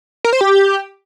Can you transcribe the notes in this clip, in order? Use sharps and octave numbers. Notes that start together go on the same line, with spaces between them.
A#4
C5
G4